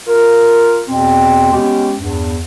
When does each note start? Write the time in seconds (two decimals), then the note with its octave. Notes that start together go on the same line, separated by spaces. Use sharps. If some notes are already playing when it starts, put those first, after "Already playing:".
0.07 F4 A#4
0.88 E2 B2 C4
1.51 G#3 B3 C#4 G4
1.98 E2 G2